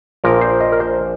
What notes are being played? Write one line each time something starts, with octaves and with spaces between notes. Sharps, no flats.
A#1 A#2 F3 A#4
C5
D#5
A#4
C5